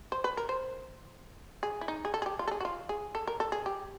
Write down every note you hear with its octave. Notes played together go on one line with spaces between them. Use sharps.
C5
B4
A#4
C5
G#4
E4
D#4
G#4
A4
G#4
G4
F4
A4
G#4
F#4
F4
G#4
A4
A#4
A4
G#4
G4